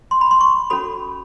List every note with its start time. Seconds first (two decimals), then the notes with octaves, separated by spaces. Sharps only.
0.11 C6
0.21 B5
0.31 C6
0.41 C#6
0.70 C#4 F#4 A4 B5